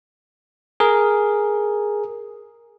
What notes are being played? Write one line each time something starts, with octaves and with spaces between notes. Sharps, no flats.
G#4 A#4